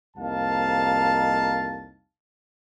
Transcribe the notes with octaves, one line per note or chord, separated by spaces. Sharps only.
C2 F2 A#3 D#4 F5 A5